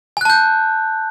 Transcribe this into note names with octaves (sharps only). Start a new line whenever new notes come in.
G#5 A5 F#6 G6